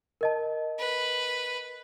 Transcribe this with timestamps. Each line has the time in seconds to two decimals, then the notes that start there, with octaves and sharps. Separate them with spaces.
0.21 A#4 D#5 A5
0.79 B4